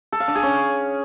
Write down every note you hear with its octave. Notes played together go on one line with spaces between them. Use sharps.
A4
F5
D4
G#4
C#4